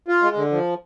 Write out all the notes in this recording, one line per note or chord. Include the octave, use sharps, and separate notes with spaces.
F4
G#3
D3
F3